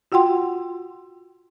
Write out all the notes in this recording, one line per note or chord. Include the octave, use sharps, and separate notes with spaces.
F4 F#4 F#5 G5 C6